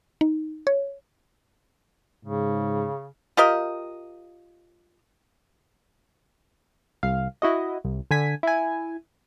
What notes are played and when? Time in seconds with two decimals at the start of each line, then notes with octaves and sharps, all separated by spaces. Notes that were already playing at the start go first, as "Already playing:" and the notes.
0.21 D#4
0.67 C#5
2.25 G#2 C#3
3.37 F4 G4 A#4 D#5
7.03 C2 F5
7.42 E4 F#4 D#5
7.84 C2
8.11 D3 G#5 B6
8.43 E4 G#5